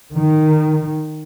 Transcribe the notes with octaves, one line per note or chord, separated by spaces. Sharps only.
D#3